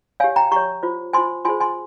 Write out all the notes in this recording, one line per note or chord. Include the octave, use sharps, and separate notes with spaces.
G4 C#5 F5 G#5
G5 A#5
G4 C#5 A#5 C#6
F4 C5
F4 C5 G#5 C6
F4 G#4 C5 G#5 C6
G#5 C6